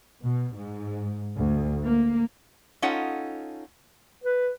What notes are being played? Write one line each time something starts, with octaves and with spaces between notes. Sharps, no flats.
B2
G#2
D2
A#3
C#4 D#4 F4 A4 F#5
B4